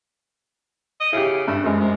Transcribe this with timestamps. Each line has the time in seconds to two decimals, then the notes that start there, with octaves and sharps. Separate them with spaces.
1.00 D#5
1.12 C#3 E4 G4
1.48 G2 A3
1.64 F#2 C3 G#3
1.80 C3